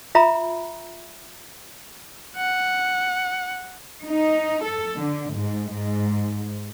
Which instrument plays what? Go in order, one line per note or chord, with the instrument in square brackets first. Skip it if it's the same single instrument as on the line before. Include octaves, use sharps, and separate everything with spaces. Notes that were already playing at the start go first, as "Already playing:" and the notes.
[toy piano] F4 E5 A#5 B5
[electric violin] F#5
[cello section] D#4
A4
D3
G#2
G#2